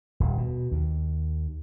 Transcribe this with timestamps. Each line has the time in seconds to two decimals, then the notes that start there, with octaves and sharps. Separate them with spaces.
0.20 D#1
0.38 B2
0.71 D#2